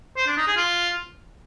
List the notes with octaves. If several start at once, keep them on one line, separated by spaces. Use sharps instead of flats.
C5
D4
D#4
G#4
F4